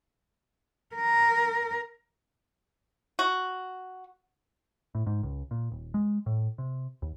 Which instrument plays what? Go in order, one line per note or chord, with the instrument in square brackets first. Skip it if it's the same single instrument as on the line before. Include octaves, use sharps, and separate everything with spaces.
[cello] A#4
[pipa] F#4
[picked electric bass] A2
G#2
C#2
A#2
D#1
G#3
A2
C3
D#2